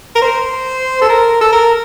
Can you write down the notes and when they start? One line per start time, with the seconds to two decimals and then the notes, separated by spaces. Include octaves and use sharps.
0.15 A#4
0.22 C5
1.02 A4
1.09 A#4
1.41 A4
1.53 A#4